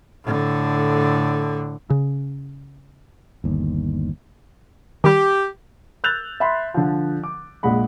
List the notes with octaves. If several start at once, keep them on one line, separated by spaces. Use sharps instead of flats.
A2 D3
C#3
G1 D#2
D#3 G3 G4
E6 F#6 G6 A6 F7
E5 B5 C6
D3 F3
D6
A#1 A#2 G#3 F#5 B5